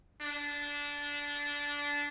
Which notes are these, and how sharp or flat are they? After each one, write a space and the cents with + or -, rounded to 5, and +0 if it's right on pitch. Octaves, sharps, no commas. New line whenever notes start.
D4 -20